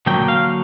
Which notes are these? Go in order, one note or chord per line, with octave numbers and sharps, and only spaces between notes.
D3 F#3 A#3 G5
F5